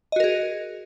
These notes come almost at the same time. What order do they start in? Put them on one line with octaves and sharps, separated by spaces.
D#5 F#4 A#4 G#4